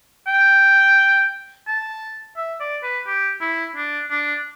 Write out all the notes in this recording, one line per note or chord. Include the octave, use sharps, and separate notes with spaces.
G5
A5
E5
D5
B4
G4
E4
D4
D4